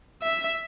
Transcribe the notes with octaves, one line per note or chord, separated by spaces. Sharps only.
E5